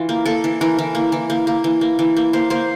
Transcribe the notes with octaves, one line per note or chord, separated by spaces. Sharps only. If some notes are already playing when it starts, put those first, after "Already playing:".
Already playing: E3 F4
A#3
A#3 A4
E3
E3 A#4
E3
A#3
E3
A#3
A#3
E3
A#3
E3
A#3
A#3 C5
A#3 C5